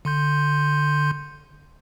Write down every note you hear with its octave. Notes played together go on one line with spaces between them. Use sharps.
D3 C6 G6